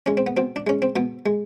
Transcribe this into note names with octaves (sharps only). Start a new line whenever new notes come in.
G#3 C#4
C4
B3
B2 C4
D4
G#3 C#4
C4
B2 B3
G#3